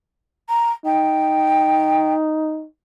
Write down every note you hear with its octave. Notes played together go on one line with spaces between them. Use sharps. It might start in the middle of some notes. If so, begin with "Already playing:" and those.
A#5
D#4 G5